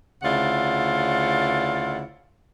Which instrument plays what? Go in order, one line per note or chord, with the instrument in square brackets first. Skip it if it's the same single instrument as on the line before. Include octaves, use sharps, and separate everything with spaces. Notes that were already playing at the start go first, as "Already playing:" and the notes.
[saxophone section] D2 C#3 E4 F4 D5 F#5